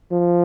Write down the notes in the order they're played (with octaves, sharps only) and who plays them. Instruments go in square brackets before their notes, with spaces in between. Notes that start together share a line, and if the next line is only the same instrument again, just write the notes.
[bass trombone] F3